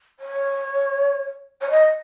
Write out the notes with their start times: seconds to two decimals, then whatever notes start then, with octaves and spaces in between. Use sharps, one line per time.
0.20 C#5
1.61 C#5
1.70 D#5